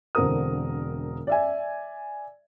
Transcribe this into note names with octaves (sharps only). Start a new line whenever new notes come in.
E1 D3 C4 A#4 D#6
D5 E5 G#5